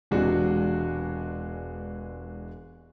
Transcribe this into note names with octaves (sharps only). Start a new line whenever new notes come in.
E1 C3 E3 G#3 D4 F#4